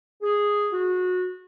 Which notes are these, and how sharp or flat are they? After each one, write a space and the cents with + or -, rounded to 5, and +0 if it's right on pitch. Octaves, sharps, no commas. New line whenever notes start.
G#4 -5
F#4 -25